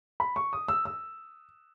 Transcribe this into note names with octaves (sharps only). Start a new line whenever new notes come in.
B5
C#6
D#6
E6
E6